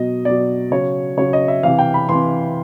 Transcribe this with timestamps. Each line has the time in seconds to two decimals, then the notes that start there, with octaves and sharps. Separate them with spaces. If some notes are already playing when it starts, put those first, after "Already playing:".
Already playing: B2 F#3 D#5
0.25 B2 F#3 D5
0.71 C#3 F#3 C#5
1.17 C#3 F#3 C#5
1.33 D#5
1.48 E5
1.63 C3 E3 F5
1.79 G5
1.94 B5
2.09 C3 E3 C6